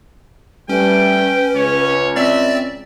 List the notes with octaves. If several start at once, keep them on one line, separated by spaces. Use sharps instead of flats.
G3 A3 C#4 B4 G5
C#2 C#5
C4 D5 E5 A6